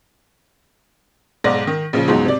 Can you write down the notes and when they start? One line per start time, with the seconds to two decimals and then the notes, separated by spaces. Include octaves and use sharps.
1.44 B1 G#2 D5 A#6
1.67 D#3
1.93 A#1 C#3 F3
2.08 C#2 G#2 B2 F#3 D#4
2.25 C3 D5